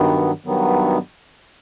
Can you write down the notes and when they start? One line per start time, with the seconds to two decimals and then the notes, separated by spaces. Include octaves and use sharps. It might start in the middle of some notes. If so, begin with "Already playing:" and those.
Already playing: G2 D#3 F#3 B3
0.45 G2 D#3 F#3 B3